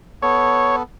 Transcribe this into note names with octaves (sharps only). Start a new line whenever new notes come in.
B3 A4 C#5